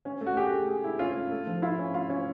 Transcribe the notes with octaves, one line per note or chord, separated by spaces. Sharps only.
C#4
A3
F#4
G4 G#4
A3
G#4
E4
C#4 F4
A3
A3
F3
E4 F4
C#4
F4
C#4